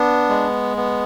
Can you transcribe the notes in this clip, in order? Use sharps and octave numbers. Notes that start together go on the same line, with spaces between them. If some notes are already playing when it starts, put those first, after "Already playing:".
Already playing: B3 D4
G#3
B3